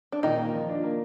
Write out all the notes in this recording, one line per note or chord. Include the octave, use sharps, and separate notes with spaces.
D4
A#2 D#3 D#4
A#3
F3
D4
A#3